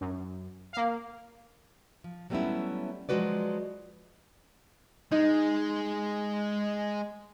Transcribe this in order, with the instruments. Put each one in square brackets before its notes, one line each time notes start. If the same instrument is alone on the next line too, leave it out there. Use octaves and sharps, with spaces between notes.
[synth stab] F#2
A#3 F5
[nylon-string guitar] F3
F#3 G3 A3 B3 C#4 E4
F3 F#3 G#3 F#4 B4 D5
[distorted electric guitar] G#3 [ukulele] D#4